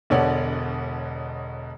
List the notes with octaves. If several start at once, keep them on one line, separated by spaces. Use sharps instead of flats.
E1 B2 D3 C#5 D5 F#5